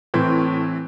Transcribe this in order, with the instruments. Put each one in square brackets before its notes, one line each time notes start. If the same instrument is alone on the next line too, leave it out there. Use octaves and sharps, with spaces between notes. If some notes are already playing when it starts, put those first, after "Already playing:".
[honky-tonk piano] A2 [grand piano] E3 C4